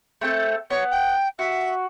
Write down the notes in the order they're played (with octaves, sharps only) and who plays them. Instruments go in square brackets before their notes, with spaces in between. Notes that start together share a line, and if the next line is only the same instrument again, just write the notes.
[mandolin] A3 C4 A4
[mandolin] B3 [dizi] C#5
[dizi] G5
[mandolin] F#4 [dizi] E5